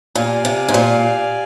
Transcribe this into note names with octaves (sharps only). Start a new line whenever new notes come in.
A#2 G4 D5 F5 G#5
C3
G#2
A#2